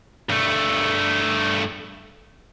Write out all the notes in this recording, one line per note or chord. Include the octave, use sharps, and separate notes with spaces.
G2 A3